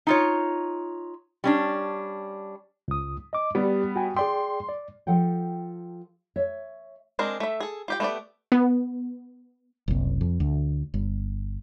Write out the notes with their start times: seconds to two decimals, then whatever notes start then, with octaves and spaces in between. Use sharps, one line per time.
0.07 D#4 F4 C#5
1.44 G3 C#4 D4
2.88 C#2 D#6
3.33 D#5 D6
3.55 G3 B3 G4 D5
3.96 F#4 G5 G#5
4.16 G#4 D5 G5 C6
4.69 D5
5.07 F3 A4 F#5 G5
6.36 C#5 E5
7.19 G#3 C4 D4 G#4 A#4
7.40 A3 E5
7.60 G#4 A4
7.88 F4 G4 G5
8.00 A3 B3 G4 C5 D5
8.52 B3
9.88 F#1 C2
10.21 F2
10.40 D2
10.94 G1